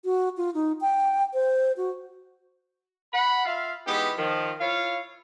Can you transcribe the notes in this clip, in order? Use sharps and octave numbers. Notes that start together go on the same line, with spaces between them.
F#4
F4
D#4
G5
C5
F#4
F#5 B5
F4 E5 F5
E3 G#3 B3 D#4 G4
D#3 F3
E4 F4 C#5 F5